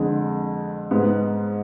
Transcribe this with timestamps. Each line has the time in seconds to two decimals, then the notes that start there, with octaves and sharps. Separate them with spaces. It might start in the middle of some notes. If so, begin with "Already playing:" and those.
Already playing: F2 D3 G#3
0.91 G#2 G#3 B3